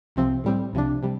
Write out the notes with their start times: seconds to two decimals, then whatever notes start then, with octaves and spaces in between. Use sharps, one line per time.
0.16 C2 C3 F3 C4
0.44 A2 G3 C4
0.73 C2 C3 F3 D4
1.03 C3 G3